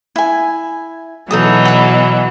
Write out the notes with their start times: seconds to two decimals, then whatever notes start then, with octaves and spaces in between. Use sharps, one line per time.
0.16 E4 G#5
1.31 B2 E3 F#3 D#4 A4 D#6
1.65 F#5 B5